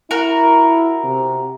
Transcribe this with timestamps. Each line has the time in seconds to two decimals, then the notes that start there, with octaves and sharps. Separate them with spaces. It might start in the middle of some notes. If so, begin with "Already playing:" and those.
0.11 E4 F#4 A#4
1.04 C3